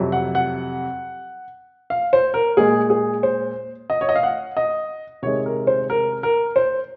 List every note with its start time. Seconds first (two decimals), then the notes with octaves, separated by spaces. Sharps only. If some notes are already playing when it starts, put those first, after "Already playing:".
Already playing: F2 C3 F#3
0.12 F#5
0.35 F#5
1.90 F5
2.13 C5
2.34 A#4
2.57 A#2 G#3 G#4
2.90 G#4
3.23 C5
3.90 D#5
4.01 C#5
4.09 D#5
4.16 F5
4.23 F#5
4.57 D#5
5.22 C3 D#3 G#3 C#5
5.46 A#4
5.67 C5
5.90 A#4
6.23 A#4
6.56 C5